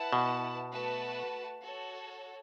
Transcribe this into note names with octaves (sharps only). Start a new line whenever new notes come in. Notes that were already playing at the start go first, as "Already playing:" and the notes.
Already playing: E4 B4 F#5 A5
B2
A3 F#4 B4 F#5 A5
F#4 A4 C#5